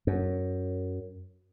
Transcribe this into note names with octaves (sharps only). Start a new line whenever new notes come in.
F#2